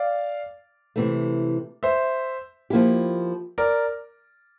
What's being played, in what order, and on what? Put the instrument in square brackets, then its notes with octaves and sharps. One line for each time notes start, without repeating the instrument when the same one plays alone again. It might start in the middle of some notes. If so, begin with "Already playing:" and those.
Already playing: [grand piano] D5 F5
[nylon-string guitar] C3 E3 A3
[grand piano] C5 E5
[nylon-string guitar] F3 A#3 E4 G4
[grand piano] A#4 D5